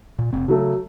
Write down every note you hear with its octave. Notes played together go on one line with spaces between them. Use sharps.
A#2
F1 C4
C#3 F#3 A3